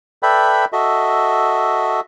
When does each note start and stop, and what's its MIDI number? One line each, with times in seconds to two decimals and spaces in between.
0.23 0.65 69
0.23 0.65 71
0.23 0.65 74
0.23 0.65 76
0.23 0.65 79
0.23 0.65 83
0.73 2.00 66
0.73 2.00 69
0.73 2.00 75
0.73 2.00 76